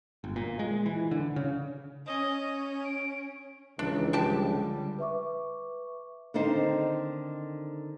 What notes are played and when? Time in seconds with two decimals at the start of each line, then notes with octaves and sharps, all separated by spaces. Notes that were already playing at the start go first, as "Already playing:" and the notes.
0.24 G1
0.36 A#2
0.59 G#3
0.86 E3
1.11 D3
1.36 C#3
2.05 C#4 D#5
2.84 D7
3.79 C#2 D#3 E3 D4
4.13 F3 G3 D4 G4 A5
4.46 D3 G3
4.99 B4 E5 C#6 D6
6.34 D3 D#3 C4 D#4 C5